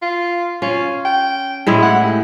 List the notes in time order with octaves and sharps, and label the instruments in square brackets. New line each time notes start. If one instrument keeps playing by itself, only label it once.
[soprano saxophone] F4
[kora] C#4 [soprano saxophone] F4
[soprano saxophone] G5
[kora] A2 G#3 E4
[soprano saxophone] F#5
G4